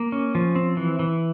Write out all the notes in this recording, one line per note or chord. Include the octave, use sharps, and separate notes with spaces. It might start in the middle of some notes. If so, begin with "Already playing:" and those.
Already playing: A#3
C#4
F3
C4
E3
E3